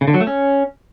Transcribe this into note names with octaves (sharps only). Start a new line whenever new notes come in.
C#3
D3
F#3
A3
C#4